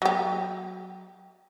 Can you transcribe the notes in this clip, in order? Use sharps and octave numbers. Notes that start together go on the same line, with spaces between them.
F#3 G4